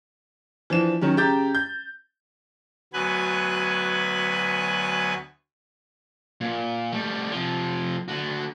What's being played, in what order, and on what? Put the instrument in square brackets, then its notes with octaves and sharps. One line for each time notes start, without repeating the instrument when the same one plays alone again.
[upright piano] E3 F3 D4 E7
D#3 F#3 C#4
C#3 G4 A#5 D6 G6 A6
G6
[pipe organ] D2 F#3 B3 B4 G#5 F#6
[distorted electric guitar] A#2
G3 A3
C3 F3
D3 F#4